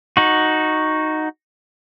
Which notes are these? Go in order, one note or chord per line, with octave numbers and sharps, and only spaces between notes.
D#4 F#4